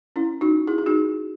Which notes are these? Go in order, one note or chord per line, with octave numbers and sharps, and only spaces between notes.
C#4 E4
D#4 F#4
E4 G#4
G#4
D#4 F#4